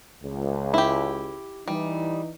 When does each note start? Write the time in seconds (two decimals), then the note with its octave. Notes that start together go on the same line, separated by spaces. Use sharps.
0.23 C#2
0.74 E4 G4
1.68 E3 G3 D#4